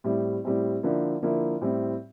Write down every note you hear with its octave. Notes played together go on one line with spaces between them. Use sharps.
A2 G3 C4 E4
A2 G3 C4 E4
D3 F3 A#3 E4
D3 F3 A#3 E4
A2 G3 C4 E4